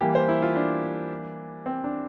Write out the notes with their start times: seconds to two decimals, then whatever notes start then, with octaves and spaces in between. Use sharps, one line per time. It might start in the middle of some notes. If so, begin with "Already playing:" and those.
0.01 E3 G3 A#3 G4
0.15 C5
0.29 E4
0.42 F4
0.56 D4
1.66 C4
1.84 D4